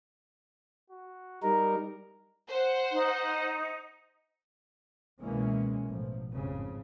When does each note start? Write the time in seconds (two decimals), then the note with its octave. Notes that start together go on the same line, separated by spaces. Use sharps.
0.90 F#4
1.43 G3 D#4 A#4 A#5
2.49 C5 F#5
2.92 D#4
5.23 C#2 B2 E3 G#3 A#3 C#4
5.87 A1 B2 F3
6.32 G#1 F2 C#3